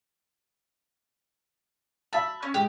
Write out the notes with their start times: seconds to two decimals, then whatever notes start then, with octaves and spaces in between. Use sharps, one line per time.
2.13 E5 A5 B5
2.43 C#4
2.54 G#3 G4